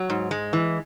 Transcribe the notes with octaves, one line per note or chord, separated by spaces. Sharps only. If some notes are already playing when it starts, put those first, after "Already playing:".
Already playing: F#3
G#2
G#3
E3